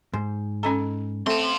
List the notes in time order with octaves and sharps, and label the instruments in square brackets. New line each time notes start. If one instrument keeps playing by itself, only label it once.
[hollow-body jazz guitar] G#2 [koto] C5
[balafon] C#4 A#5 [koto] A4 D#5 G#5
[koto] A3 [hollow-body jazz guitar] C4 [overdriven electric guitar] A5 C6